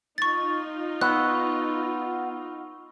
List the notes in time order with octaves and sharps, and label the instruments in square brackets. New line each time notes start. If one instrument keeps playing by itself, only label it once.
[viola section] D#4 F4 [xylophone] C#6 A6
[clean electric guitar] B3 [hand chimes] C#6 E6 [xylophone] F#6